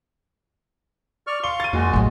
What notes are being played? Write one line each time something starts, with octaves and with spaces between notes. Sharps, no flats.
D5 C#6 F6
F5 C6 C#6 G7
A6 D#7
F2 A#2 G#3 F#4
A1 A2 F#3